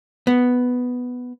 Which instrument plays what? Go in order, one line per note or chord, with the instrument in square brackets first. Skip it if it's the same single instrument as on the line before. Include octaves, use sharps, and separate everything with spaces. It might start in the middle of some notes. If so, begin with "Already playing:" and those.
[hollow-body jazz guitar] B3